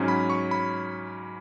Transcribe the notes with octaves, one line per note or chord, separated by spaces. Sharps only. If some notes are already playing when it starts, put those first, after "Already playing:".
Already playing: G#2 F#3 C#4
B5
C#6
B5